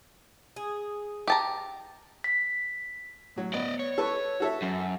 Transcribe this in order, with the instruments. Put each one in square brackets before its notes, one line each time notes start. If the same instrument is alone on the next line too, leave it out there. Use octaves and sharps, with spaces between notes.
[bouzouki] G#4
[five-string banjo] G4 A5 A#5
[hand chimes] B6
[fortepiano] A2 F#3
[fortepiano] B3 [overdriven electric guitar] D5 D#5
[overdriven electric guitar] C#5
[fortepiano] A4 B4 C#6
F#4 A4 E5
[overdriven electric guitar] F#2